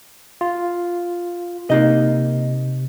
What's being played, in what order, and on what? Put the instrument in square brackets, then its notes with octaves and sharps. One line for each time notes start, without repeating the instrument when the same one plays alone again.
[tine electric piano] F4
[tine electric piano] C3 [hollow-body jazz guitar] A#3 D#4 D#5